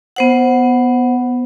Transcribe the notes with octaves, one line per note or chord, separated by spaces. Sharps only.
B3 C5 F#5